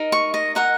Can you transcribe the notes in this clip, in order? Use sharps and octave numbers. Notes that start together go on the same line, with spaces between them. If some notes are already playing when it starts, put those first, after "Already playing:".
Already playing: D#4 A#4 D#5
C#6
D#5
D#4 A#4 D#5 F#5